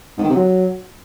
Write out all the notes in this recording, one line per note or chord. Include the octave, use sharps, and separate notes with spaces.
G#2
D#3
C3
F#3